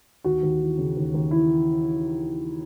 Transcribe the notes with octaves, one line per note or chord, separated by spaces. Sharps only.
D#2 F#4
D#2
E3
C#3
D#2
D#2
E3 E4